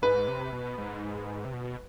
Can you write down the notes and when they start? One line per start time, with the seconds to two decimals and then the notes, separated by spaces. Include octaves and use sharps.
0.02 G#2 B4
0.28 C3
0.52 B2
0.78 G#2
1.45 C3
1.53 B2